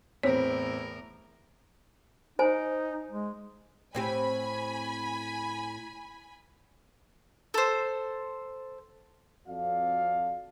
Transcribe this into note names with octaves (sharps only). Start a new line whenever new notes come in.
E2 A2 C4 A#4 C#5
D#4 C5 G#5
G#3
A2 C4 G4 G#5 B5
A4 C5
F2 C4 F#4 A4 D5 F5